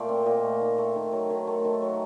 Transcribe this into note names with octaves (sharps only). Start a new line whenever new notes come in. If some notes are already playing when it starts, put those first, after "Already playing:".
Already playing: A#2 A3 C5 D5
C4
A#2 D#5
A3
D#3
A3
D#3
F#3
D#3
A3
D#3
F#3